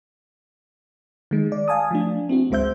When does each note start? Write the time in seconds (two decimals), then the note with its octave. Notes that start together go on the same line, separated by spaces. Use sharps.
1.31 D#3 G#3
1.52 D5
1.68 F5 G#5 A5 D#6
1.91 F3 A3 D4
2.29 C4 E4 F#4
2.50 G1 C#2 G#3 C5 E5 G6